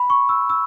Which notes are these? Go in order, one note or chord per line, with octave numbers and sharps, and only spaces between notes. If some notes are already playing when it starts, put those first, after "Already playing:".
Already playing: B5
C#6
E6
E6